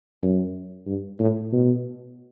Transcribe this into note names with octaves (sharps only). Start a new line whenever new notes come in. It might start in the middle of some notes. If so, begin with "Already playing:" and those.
F#2
G2
A2
B2